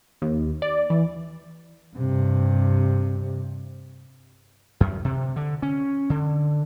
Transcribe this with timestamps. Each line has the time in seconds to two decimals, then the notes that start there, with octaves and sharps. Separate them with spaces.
0.22 D#2
0.62 D5
0.90 E3
1.96 G2 C3
4.80 F#2
5.05 C3
5.36 D3
5.62 C#4
6.10 D3